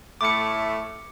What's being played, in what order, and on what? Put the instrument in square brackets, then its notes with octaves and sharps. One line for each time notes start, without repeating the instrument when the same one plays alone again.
[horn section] A2 A3 [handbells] D6 C#7